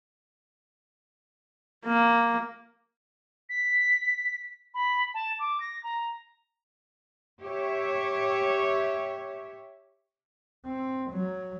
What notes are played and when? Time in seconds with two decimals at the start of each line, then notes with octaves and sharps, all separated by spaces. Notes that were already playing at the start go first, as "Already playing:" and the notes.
1.86 A#3
3.49 B6
4.74 B5
5.14 A5
5.39 D6
5.60 A#6
5.83 A#5
7.41 G4 C#5 E5
10.65 C4
11.11 F#3